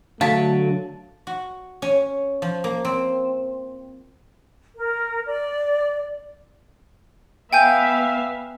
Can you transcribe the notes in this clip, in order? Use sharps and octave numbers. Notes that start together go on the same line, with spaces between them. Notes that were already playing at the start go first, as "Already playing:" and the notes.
D3 F#3 A3 F5 A5 C#6
F#4
C#4
F3
A#3
C4
A#4
D5
B3 E5 F5 G5 G#5 G6